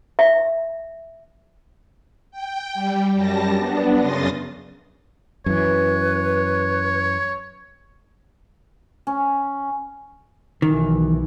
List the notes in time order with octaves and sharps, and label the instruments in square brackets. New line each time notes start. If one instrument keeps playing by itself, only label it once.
[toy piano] E5
[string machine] G5
G3
F#2 G3 A5 A#6
B3 D4
F#2 C#3 C6 D#6 A6 A#6
[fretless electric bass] F#2 E3 [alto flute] B4 [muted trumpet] C#5
[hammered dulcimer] C#4
[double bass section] B1 E3 [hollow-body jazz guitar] D#3